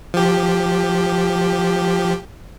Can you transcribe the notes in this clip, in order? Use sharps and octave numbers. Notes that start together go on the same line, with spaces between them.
F3 G4